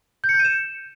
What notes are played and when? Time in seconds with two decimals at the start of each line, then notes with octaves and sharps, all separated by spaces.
0.24 G6
0.29 C#7
0.34 G6
0.39 D#7
0.45 E7